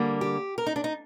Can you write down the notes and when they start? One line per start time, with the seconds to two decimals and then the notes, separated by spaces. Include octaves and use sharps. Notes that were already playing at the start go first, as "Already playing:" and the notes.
Already playing: D3 G3 A#3
0.21 G4
0.58 A#4
0.66 D#4
0.76 D4
0.84 D#4